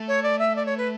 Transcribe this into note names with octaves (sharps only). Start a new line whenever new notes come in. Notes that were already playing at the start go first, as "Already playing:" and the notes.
Already playing: A3
C#5
D5
E5
D5
C#5
B4